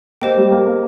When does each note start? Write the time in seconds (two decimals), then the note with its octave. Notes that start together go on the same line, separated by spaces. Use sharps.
0.21 A#3 G4 C5 D#5 G5
0.37 G3
0.52 A#3
0.67 A#3